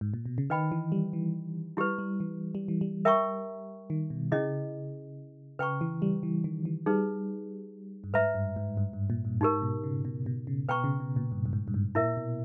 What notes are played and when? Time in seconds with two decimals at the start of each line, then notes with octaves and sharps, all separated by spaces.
0.01 G#2
0.14 A#2
0.26 B2
0.38 C#3
0.50 D#3 B4 D#5 G5 B5
0.72 E3
0.92 G3
1.13 E3
1.77 G3 E4 G4 B4
1.99 G3
2.20 E3
2.55 G3
2.68 E3
2.81 G3
3.05 A#4 E5 G5 A#5 C#6
3.90 D#3
4.10 B2
4.32 C#3 C#4 E4 G#4 D#5
5.59 C#3 B4 G5 A#5 C#6
5.81 E3
6.02 G3
6.23 E3
6.44 D#3
6.65 E3
6.86 G3 D#4 G#4 B4
8.04 G2
8.14 G#2 B4 E5 A#5
8.35 G2
8.56 G#2
8.77 G2
8.93 G2
9.10 A#2
9.25 G2
9.41 G#2 D#4 G4 A#4
9.62 B2
9.84 C#3
10.05 B2
10.26 B2
10.47 C#3
10.69 B2 B4 G5 A#5 C#6
10.84 C#3
11.00 B2
11.16 A#2
11.32 G2
11.46 G2
11.53 G#2
11.68 G2
11.74 G#2
11.95 A#2 E4 A#4 E5
12.17 B2